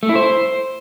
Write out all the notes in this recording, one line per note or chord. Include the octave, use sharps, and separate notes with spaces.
A3
E4
C5